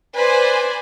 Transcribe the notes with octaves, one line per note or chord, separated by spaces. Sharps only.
B4 C5 D5 G#5